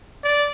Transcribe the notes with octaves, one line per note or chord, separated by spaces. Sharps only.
D5